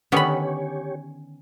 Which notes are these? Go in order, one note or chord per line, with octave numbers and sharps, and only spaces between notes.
D3 D#3 B3 C#4 G4 C#5 B5